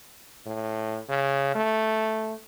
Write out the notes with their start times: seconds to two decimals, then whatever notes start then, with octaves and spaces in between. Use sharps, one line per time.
0.46 A2
1.09 C#3
1.55 A3